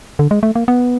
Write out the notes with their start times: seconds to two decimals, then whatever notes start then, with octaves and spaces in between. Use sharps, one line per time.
0.19 D3
0.31 G#3
0.43 A3
0.55 A#3
0.68 B3